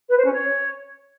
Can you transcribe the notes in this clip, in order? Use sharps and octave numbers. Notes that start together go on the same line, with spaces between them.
B4
C5
C#4
C#5